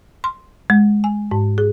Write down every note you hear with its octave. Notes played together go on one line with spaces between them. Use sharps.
C6
G#3
G#5
G#2
G#4